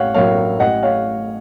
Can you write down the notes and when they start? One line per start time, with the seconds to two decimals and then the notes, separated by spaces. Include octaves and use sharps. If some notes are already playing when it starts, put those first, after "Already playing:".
Already playing: A1 C#5 F5 F#5
0.14 A2 F#3 A#3 C#5 F5
0.59 A1 D#5 F#5
0.83 C#5 F5